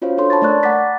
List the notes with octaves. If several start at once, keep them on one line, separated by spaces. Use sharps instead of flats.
C#4 F4 F#4 C5 C#5 F5
D4 A4 C#5 C6
A5 B5 C#6 A6
A3 A#4 D5 C#6 F#6
A3 F#5 A#5 D6 A6 B6